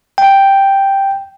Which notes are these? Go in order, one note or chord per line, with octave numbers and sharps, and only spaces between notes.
G5